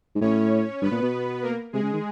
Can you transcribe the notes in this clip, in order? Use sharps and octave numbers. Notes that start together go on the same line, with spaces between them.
G#2
A2 C#4 C#5
G2 B3 B4
A#2
B2
A#3 A#4
C3 G#3 G#4
C#3
D#3